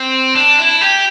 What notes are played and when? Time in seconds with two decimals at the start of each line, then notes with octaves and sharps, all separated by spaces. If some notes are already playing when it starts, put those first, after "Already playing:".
Already playing: C4
0.35 D4
0.58 E4
0.81 G4